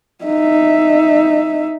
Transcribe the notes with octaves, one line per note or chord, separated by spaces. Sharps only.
D#4 E5